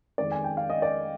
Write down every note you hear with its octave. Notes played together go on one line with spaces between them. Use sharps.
F2 D#3 G#3 D5
G#5
G5
F5
D#5
D5